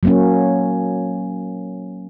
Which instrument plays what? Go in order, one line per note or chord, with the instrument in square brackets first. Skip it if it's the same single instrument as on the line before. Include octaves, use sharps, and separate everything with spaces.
[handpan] F#3 A#3 C#4